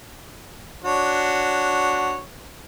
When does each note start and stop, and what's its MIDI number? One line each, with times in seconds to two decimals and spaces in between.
0.85 2.20 62
0.85 2.20 66
0.85 2.20 73